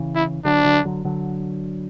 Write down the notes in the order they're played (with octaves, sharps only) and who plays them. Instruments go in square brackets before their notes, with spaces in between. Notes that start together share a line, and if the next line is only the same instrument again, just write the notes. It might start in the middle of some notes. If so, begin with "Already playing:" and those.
Already playing: [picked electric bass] C#3 E3
[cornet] E4
[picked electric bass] D3 F#3 [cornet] D4
[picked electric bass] D3 F#3
D3 F#3
D3 F#3